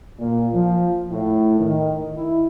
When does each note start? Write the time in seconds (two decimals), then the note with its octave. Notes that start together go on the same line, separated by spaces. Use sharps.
0.19 A#2
0.53 F3
1.11 A2
1.59 D#3
2.16 E4